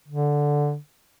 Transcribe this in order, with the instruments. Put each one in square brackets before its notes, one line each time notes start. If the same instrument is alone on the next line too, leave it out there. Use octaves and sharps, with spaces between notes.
[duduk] D3